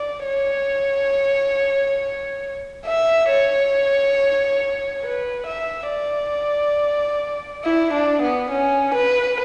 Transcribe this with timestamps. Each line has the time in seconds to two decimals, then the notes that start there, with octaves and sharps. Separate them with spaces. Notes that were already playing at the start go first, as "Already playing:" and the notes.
Already playing: D5
0.26 C#5
2.86 E5
3.30 C#5
5.04 B4
5.47 E5
5.90 D5
7.65 E4
7.93 D4
8.22 B3
8.51 C#4
8.95 B4